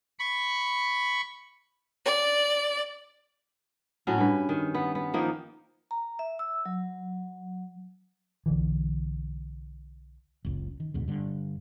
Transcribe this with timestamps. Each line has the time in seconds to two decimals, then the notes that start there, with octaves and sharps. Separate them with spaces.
0.19 B5 C#6
2.04 D5
4.07 A2 F#3 C#4 F#4
4.18 G2 B4
4.49 D#3
4.74 B3
4.95 B3
5.13 D#3 F3 A#3 D#4
5.91 A#5
6.19 E5
6.39 E6
6.66 F#3
8.46 B1 D3 E3
10.45 F#1 C#2
10.80 D#3
10.94 D2 G#2 B2
11.08 G2 D3